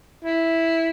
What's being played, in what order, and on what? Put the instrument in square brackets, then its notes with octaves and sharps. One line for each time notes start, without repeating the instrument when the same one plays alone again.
[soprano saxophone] E4